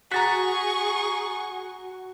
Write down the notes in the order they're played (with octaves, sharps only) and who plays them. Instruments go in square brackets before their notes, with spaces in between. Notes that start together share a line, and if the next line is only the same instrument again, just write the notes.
[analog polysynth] F#4 [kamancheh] G#4 [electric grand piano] A#5 A6 B6 [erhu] C#6